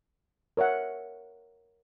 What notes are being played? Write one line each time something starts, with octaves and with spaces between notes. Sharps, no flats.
A#4 C#5 E5 F#5